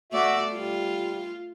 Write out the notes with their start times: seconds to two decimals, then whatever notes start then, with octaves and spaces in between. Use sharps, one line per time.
0.12 A3 F#4 D5 E5
0.51 G3 F4